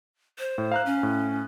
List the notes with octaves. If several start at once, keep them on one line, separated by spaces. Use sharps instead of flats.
C5
A2
F5 A#5 F#6
C#4
A2